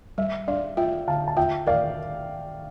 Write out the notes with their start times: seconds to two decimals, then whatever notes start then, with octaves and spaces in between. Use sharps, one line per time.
0.18 G3 E5
0.48 D4 D5 F5
0.77 F4 E5 G5
1.07 D3 F5 A5
1.28 A5
1.37 F4 E5 G5
1.67 A#4 D5 F5